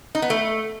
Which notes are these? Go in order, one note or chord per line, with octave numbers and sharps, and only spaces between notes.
D#4
B3
A3